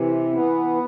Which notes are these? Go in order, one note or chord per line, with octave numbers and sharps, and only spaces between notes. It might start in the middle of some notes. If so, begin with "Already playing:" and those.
Already playing: C3 E3
B3